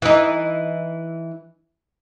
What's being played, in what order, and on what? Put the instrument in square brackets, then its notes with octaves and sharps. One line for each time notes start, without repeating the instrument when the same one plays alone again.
[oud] E3 D#4